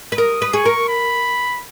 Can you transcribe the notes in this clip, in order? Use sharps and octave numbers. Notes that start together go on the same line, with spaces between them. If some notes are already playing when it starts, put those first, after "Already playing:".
B4
A#4 D#6
B4
G#4 C#6
A#4
B5